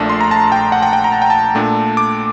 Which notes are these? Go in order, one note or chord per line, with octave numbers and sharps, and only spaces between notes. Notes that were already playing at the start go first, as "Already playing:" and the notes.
Already playing: A#1 A#2 A3 D4 A5
C6
A#5
A5
G5
F#5
G5
G5
A#5
A5
G5
A5
A#2 A3 D4
D6